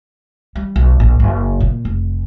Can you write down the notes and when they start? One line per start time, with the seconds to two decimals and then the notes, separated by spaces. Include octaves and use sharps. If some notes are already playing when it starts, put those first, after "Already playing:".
0.55 G3
0.76 B1
1.00 A#1
1.20 F#1
1.60 A#2
1.85 F1